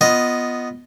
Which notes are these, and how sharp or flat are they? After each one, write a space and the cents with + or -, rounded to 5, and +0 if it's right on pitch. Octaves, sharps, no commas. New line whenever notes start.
B3 +0 F4 +0 D#5 +0